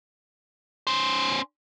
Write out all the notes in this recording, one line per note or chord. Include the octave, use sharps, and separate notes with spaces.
C#4 C5